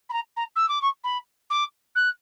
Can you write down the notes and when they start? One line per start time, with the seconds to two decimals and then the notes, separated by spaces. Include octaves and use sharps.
0.09 B5
0.13 A#5
0.36 A#5
0.56 E6
0.68 D6
0.82 C#6
1.04 B5
1.50 D6
1.95 F#6